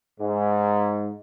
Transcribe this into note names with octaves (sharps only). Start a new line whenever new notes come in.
G#2